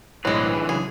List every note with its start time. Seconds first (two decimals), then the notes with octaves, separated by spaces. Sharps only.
0.25 B1 A2 D3 E3 G#3 C4 B4 C#5
0.69 C#3 F#3 G#4